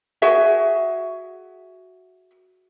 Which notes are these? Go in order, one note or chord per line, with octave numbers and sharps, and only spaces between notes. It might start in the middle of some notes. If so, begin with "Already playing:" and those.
F#4 G#4 E5